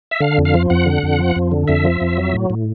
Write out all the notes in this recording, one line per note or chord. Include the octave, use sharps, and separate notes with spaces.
E5
D3 F5
F2
F5
F3
F2 F#5
D3
F2
F3
F2
D3
F2 E5
F3
F2
F#3
A2
A2